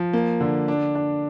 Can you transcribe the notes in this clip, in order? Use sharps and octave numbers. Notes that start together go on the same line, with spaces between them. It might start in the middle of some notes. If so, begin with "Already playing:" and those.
Already playing: F3
A#3
D3
D4
D4